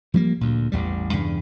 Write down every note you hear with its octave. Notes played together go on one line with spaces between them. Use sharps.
F3 G3 A3 A#3
D2 A#2
A1 E2 G3
E2 G2 C#3